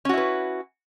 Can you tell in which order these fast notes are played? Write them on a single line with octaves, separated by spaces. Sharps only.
C#4 F#4 E4 B4